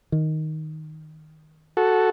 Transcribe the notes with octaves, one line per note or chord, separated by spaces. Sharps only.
D#3
F#4 A4